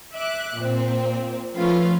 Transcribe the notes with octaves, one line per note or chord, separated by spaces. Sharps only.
E5 D6 F#6
A#2 C4
F3 A3 C#4 F4 B4 F5